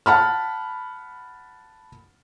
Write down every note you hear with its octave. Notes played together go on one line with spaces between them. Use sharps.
F#5 A5 B5 F6